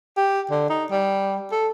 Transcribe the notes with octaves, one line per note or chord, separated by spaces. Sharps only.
G4
D3
D#4
G3
A4